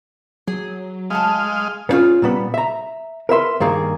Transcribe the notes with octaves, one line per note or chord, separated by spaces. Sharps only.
F#3 G#4
G#3 A3 D#5 F5 F#5 A5
B3 C#4 D4 F4 G#4
A#2 G3 B3
E5 A#5
A#4 B4 E5 C6
G2 D#3 A#3 G#4